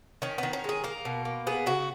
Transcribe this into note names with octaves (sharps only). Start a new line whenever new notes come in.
D#3 C#4
D#3 B3
C#4
G#3 G#4
A#3 A#4
B2
A#3
B3 G#4
C#3 F#4